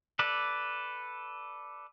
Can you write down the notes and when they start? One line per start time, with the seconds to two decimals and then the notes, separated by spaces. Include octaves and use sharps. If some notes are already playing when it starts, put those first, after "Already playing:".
0.19 A4 B4 D5